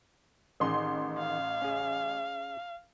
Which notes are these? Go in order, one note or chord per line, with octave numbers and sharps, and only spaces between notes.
A1 D#3 G#4 C6
F5
C#4 G#4